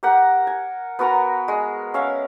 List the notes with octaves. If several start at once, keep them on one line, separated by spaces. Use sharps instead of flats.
G4 A#4 F#5
G#5
B3 F#4 A#4 A#5
G#3
C#4 E5 F5